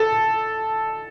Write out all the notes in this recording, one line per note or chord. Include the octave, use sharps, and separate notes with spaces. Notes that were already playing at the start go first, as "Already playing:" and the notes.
Already playing: A4